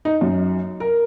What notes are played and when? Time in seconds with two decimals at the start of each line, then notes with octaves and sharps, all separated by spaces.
0.05 D#4
0.21 F#2
0.80 A#4